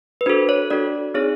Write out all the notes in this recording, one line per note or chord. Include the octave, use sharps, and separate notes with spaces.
B4
D4 F#4 A4 C5
C#5
D4 F#4 A4 D5
C4 D#4 G#4 C#5